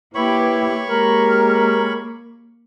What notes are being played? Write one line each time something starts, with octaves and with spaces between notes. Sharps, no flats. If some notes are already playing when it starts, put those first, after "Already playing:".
A#3 E4 G4 B4 C#5 B5 C#6
G#3 A#3 G4 A#4